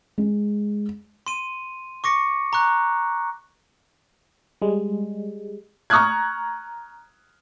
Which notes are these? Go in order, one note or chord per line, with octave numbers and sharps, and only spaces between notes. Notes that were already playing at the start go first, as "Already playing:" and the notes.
G#3
C6 D#7
C#6 D6 A#6 C#7
A#5 C#6 F#6
G3 G#3
A#5 C#6 D#6 F6 F#6 G#6